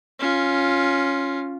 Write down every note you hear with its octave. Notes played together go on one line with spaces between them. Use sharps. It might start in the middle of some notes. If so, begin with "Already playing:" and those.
C#4 F4